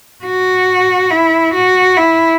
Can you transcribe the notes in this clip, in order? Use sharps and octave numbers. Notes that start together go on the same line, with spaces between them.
F#4
E4
F#4
E4